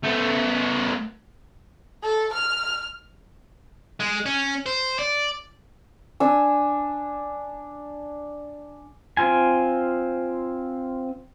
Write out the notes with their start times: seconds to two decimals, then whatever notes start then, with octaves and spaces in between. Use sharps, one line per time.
0.03 A3 B3
2.03 A4
2.34 F6
4.00 G#3
4.26 C#4
4.66 C5
4.99 D5
6.20 D4 G#5 E6
9.17 C4 F4 G#5